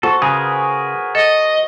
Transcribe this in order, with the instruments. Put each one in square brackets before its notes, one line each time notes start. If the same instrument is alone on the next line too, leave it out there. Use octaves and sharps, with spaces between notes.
[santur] F#4 C5 [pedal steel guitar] A4
[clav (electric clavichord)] C#3 [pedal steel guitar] G#4 A#4 B4
[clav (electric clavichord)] A4 [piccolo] D#5